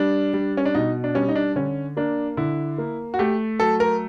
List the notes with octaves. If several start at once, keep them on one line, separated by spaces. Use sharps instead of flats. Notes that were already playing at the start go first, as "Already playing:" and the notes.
Already playing: G3 D4
G3
C#4
D4
B2 D#4
D4
G3 C#4
D#4
D4
D3 C#4
A#3 D4
D3 E4
A#3
F#4
A3 G4
F#3 A4
A#4